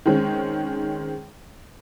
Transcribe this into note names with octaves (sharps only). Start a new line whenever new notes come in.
D#3 G#3 C4 C#4